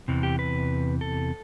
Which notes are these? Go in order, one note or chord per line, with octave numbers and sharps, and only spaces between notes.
E2 C3 E3
G4
B4
A4